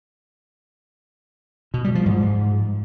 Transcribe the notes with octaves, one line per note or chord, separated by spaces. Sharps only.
B2
G3
F3
G#2